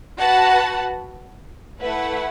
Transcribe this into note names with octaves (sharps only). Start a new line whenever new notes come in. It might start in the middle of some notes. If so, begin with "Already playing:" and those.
F#4 B4 F#5 A5
A3 E4 B4 F#5